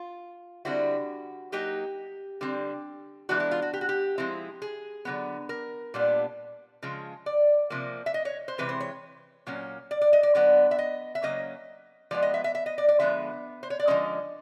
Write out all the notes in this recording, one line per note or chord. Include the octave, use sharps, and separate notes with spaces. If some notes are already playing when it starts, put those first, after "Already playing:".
Already playing: F4
D3 G3 C4 E4 F#4
F#3 A#3 D#4 G4
D3 G3 C4
E3 G#3 B3 D4 F#4
E4
F4
F#4
G4
F#4
G4
F3 G#3 C4 E4
G#4
D3 F#3 B3
A#4
A#2 G3 B3 D4
C#3 F3 G#3
D5
C3 F3 A#3
E5
D#5
C#5
C5
C3 E3 G#3 C4 B4
C5
C#5
A#2 F#3 A#3 C#4
D5
D5
D#5
D5
D3 F#3 B3 D5
E5
D#5
E5
C#3 F#3 A#3 C#4 D#5
F3 G#3 B3 D5
D#5
E5
E5
E5
D#5
D5
D5
D3 F3 G#3 B3 E5
C5
C#5
D5
D3 F3 G#3 C#4 D#5